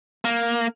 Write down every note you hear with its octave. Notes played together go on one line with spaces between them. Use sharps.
A#3